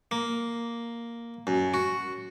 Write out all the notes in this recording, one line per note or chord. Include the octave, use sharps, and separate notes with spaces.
A#3
F#2
F#4